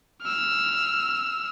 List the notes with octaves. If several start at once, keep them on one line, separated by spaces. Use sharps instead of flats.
E6 F6